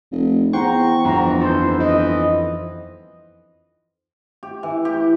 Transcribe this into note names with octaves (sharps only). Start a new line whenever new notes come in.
F1
E2 C5 F#5 G5 A#5 C#6
G1 F2 E3 F#5 A#5
D#4 A4 C5
E3 D#5
G4
E3
G4